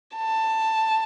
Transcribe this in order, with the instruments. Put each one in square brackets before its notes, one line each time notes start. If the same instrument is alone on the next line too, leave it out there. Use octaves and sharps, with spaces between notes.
[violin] A5